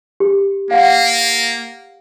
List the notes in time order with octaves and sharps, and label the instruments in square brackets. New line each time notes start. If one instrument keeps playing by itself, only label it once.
[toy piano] G4
[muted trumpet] A#3 [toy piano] F5 F#5